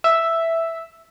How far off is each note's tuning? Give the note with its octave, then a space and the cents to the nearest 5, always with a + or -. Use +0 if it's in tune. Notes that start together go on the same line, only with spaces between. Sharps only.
E5 +0